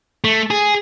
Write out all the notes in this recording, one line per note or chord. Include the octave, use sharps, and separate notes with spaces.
A3
G#4